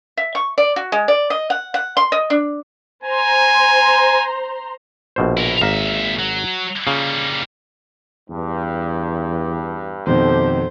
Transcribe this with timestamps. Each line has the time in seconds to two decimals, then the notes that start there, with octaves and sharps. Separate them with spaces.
0.17 E5
0.35 C#6
0.58 D5
0.76 F#4
0.92 G#3
1.08 D5
1.30 D#5
1.50 F#5
1.74 F#5
1.97 C6
2.12 D#5
2.30 D4
3.04 C5 G#5 A#5 C6
5.16 A#1 B2 C5
5.37 E4 A#4
5.62 G#1 A#2 E5 F5 A#5
6.19 F#3
6.87 C#3 G3 A#3 F4
8.29 E2 G2
10.07 F2 B2 D#3 A3 G4 C5